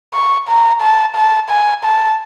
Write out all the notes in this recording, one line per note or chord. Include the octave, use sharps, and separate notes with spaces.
C#6
A#5
A5
A5
G#5
A5